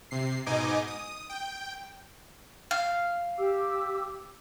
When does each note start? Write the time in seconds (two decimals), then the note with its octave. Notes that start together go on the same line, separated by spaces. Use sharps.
0.11 C3 C7
0.46 G#2 B2 D#4 D#5 G#5 D6
0.87 D#6
1.29 G5
2.71 F5
3.38 G4 D6 E6